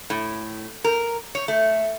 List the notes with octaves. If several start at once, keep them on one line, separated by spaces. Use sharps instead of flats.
A2
A#4
C#5
A3